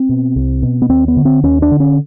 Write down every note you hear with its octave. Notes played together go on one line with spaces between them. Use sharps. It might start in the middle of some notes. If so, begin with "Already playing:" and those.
Already playing: C4
B2
C2
B2
B3
D#2 C4
B3
D3
C4
D#2 C#4
D4
D3
C#4